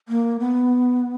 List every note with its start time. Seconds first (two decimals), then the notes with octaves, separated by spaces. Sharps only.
0.08 A#3
0.40 B3